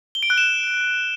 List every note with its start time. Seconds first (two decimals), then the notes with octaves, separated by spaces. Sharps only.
0.15 G7
0.23 D7
0.30 F#6
0.38 E7